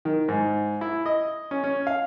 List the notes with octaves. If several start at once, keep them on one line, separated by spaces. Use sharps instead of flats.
D#3
G#2
E4
D#5
C#4
C#4
F5